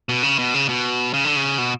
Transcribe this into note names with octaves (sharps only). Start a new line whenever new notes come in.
B2
C#3
B2
C#3
B2
C#3
D3
C#3
B2